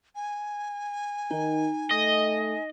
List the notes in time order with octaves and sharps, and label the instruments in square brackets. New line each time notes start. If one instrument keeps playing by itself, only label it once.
[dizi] G#5
[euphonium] D#3 [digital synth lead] D#4
[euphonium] A3 [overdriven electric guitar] D#5